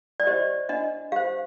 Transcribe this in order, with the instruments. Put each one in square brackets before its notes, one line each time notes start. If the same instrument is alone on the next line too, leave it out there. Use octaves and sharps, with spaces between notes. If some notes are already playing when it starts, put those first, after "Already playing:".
[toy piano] D5
G4 C5 D#5
D4 D#5
G4 C5 F5